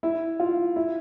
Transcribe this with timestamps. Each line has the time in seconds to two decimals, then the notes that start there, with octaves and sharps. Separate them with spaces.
0.03 E4
0.40 F4
0.76 E4